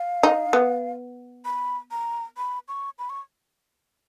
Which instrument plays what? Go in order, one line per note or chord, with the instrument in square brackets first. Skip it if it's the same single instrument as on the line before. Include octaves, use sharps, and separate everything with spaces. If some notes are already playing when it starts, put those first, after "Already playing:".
Already playing: [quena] F5
[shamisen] D#4
B3
[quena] B5
A#5
B5
C#6
B5
C#6